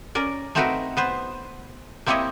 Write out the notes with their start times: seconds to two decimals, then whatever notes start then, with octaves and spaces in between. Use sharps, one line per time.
0.15 C#4 A#4 D5
0.55 A3 C4 D#4 F#4 A#4 B4
0.97 B3 B4 C5
2.06 A#3 C4 E4 G4 C#5 D#5